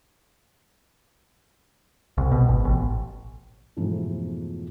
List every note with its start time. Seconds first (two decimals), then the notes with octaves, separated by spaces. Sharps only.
2.18 C2
2.32 B2
2.48 G#1
2.65 A1
3.77 F2 G#2 B2 E3 F3 A3